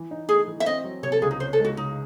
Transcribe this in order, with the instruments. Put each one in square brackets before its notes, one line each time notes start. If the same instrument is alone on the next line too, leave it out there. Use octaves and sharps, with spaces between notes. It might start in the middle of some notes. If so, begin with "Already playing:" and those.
Already playing: [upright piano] E3
D#4
[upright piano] A3 [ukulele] G#4
[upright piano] E3
[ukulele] E5
[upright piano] C4 [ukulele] D#5
[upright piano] F#3
[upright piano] C3 [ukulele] C#5
[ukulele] A4
[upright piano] C#2 [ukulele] G#4
[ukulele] D#4
[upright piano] C#4 [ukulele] C5
[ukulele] A4
[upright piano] G#3 [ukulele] F#4
[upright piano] C#3 [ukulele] D#4